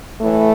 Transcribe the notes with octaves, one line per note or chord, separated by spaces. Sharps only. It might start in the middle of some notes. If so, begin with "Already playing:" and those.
A2 E3 A3